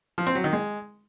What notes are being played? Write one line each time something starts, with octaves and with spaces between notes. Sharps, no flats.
F3
C4
F#3
D#3
G#3